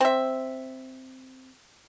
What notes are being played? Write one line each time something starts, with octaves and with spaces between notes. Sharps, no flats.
C4 E5